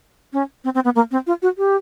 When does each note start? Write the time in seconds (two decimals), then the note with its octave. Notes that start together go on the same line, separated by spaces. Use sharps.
0.33 C#4
0.64 C4
0.75 C4
0.84 B3
0.95 A#3
1.11 C4
1.27 F4
1.42 F#4
1.58 G4